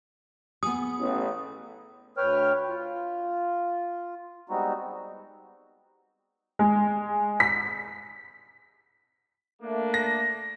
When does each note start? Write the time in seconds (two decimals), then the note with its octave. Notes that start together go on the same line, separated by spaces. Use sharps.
0.63 B3 G#4 D#6
0.99 A1
2.17 D2 B4 C#5 G5 F6
2.69 F4
4.49 G3 G#3 B3 C4 D#4 F#4
6.59 G#3
7.40 B6
9.62 A3 A#3 D4
9.94 A#6